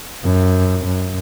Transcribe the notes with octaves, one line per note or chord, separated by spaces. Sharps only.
F#2
F#2